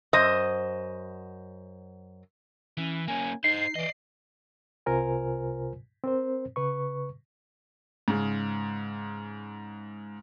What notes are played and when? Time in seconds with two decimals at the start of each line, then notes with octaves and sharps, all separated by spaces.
0.13 F#2 C5 D#5
2.77 E3 C#4
3.08 A#3 C#4 G#5
3.44 D#4 C5 D#5 C7
3.75 E3 D5 D#5
4.86 C2 C3 F4 A#4 C5 G#5
6.04 C4 A#4 C5
6.56 C#3 B4 C#6
8.08 G#2 C#3